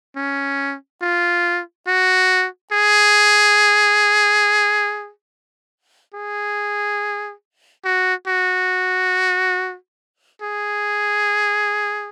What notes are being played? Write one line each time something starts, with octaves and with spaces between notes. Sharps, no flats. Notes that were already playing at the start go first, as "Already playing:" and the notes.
C#4
F4
F#4
G#4
G#4
F#4
F#4
G#4